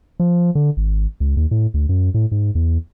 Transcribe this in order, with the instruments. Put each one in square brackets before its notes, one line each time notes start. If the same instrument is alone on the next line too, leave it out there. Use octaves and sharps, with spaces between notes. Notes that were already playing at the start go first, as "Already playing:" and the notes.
[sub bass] F3
D3
G#1
C#2
D#2
A2
D2
F#2
A2
G#2
E2